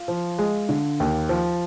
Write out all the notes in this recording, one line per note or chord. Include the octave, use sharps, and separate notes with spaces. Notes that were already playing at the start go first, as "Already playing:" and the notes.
Already playing: F4
F3
G#3
D3
D#2
F3